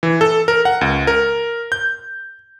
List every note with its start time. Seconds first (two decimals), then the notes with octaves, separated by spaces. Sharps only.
0.03 E3
0.21 A4
0.48 A#4
0.65 F#5
0.81 C#2
1.07 A#4
1.72 G6